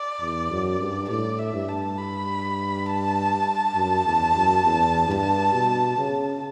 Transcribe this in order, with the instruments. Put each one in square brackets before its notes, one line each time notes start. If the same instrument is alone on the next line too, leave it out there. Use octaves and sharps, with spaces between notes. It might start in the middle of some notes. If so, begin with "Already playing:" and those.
Already playing: [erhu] D5
[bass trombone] E2
F#2
G2
[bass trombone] A2 [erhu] D5
[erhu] E5
[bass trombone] G2
[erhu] A5
B5
A5
[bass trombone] F#2
E2
F#2
E2
G2
B2
C#3